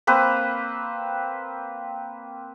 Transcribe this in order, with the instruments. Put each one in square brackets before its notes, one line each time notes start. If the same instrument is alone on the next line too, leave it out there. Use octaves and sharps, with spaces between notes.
[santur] A#3 C4 B4